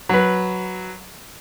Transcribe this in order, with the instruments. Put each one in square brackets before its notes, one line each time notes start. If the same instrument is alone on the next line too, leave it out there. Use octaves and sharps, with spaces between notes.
[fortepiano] F#3 B4